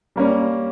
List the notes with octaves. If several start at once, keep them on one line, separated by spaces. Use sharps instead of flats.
G3 A#3 C#4